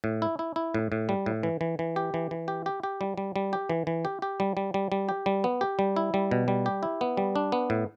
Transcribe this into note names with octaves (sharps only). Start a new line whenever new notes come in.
A2
E4
E4
E4
A2
A2
G3
A2
E3
E3
E3
G4
E3
E3
G4
G4
G4
G3
G3
G3
G4
E3
E3
G4
G4
G3
G3
G3
G3
G4
G3
B3
G4
G3
E4
G3
B2
G3
G4
E4
B3
G3
D4
B3
A2